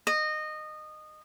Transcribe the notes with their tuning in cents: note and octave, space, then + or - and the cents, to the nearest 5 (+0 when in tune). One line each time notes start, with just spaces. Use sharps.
D#5 -20